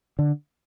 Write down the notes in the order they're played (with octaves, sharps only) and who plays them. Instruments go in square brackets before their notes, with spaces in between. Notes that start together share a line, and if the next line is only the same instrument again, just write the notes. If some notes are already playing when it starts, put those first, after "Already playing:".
[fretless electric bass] D3